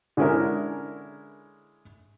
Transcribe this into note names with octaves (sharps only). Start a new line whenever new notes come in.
D3 G#3 C#4 E4 G#4 A#4